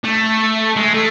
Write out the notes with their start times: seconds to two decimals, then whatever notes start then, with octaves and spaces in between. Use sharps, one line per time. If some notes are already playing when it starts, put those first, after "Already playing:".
0.04 A3
0.76 G#3
0.94 A3